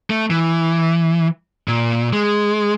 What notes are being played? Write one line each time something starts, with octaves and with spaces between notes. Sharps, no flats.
A3
E3
A#2
G#3